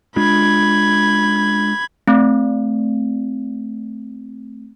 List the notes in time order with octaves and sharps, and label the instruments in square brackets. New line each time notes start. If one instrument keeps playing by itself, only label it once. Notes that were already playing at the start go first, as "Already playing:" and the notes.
[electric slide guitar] G#3 D4 F4 [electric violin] B5 G#6
[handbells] A3 C4